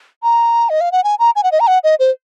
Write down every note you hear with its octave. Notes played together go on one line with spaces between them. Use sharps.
A#5
D#5
F5
F#5
G#5
A#5
G#5
F#5
D#5
A#5
F#5
D#5
C5